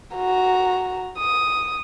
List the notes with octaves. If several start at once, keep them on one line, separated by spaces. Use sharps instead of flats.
F#4 A#5
D#6